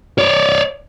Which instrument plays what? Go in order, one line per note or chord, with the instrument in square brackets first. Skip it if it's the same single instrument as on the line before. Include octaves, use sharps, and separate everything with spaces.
[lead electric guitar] C#5 D5